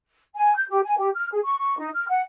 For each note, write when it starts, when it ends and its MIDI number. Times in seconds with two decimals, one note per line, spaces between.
0.35 0.52 80
0.55 0.64 91
0.69 0.79 67
0.83 0.97 80
0.97 1.09 67
1.14 1.27 89
1.32 1.39 68
1.43 1.58 85
1.58 1.76 85
1.77 1.89 63
1.94 2.05 89
2.08 2.22 78